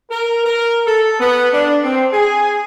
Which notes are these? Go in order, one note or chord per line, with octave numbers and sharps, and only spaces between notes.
A#4
A#4
A4
B3
D4
C4
G#4